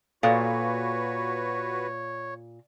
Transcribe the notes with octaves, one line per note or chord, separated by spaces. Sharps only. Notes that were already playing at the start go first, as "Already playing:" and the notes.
A#2 F#4 A4 B4 C#5 F5